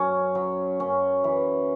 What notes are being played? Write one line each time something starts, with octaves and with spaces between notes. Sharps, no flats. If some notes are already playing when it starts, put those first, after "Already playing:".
Already playing: F#2 F#3 C#4
F#3
F#2 C#4
E3